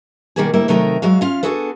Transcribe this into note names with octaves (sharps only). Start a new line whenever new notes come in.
B2 D#3 G3 A#3 G4 G#4
D2 G3 A#3 E4 E5
C3 D#3 F#3 A3 D#4 A#4
F#3 G#3 F#4 F5
C#4 F4 F5
B3 D4 F#4 G#4 A4 B4